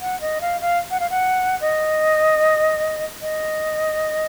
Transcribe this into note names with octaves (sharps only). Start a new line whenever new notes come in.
F#5
D#5
F5
F5
F#5
F5
F#5
D#5
D#5